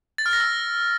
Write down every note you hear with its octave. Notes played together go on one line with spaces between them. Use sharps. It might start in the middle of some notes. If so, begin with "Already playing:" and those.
A6
F6
A#6
E6